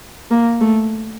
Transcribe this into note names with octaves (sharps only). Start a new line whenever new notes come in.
A#3
A3